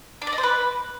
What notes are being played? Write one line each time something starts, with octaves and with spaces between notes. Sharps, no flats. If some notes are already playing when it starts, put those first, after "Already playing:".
D4
D5
D#5
C5
B4